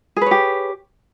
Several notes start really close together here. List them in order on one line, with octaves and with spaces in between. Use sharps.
G#4 B4 C#5 G4